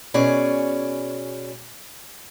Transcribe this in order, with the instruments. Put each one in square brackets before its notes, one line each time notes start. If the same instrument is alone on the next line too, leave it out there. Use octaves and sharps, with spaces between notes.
[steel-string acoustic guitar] B2 C#4 G#4 D5